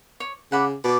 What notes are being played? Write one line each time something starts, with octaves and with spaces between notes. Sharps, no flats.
C#5
C#3 F#5 B5 D6
B2 D5